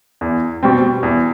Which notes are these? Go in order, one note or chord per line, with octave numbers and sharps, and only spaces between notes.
E2
B2 G3 C4
E2